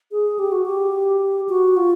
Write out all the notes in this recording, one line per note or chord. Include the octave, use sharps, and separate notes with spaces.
G#4
G4
F#4
G4
F#4
F4